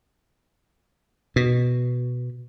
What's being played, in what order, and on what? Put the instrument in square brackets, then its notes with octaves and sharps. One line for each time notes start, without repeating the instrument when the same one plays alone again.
[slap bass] B2